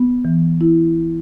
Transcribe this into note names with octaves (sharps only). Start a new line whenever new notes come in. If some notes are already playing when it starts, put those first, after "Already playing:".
Already playing: B3
E3
E4